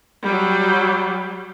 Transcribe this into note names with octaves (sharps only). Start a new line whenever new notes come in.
F#3 G3